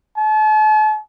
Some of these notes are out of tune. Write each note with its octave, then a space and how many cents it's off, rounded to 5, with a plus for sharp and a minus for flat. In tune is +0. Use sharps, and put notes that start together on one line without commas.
A5 -40